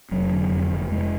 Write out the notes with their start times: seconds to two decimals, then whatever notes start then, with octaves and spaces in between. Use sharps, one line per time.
0.11 F1 F#3
0.32 D3
0.51 F2
0.71 F1
0.92 F1 G#3